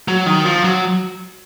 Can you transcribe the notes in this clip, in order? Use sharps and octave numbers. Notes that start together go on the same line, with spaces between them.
F#3
D#3
F3
F#3